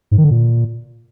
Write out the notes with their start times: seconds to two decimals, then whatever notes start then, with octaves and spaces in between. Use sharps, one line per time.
0.11 G#2
0.18 D#3
0.24 D3
0.31 A#2